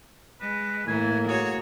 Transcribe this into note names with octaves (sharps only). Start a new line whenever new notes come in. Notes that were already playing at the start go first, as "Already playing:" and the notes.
G#3 B4
A2 E3 A#3 G#5
F#4 G#4 C#5